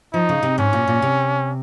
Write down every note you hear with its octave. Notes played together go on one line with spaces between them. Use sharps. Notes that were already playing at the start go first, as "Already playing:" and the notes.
F3 D#4
C#3
C3
G#2 C#4
A#2
A#2
C3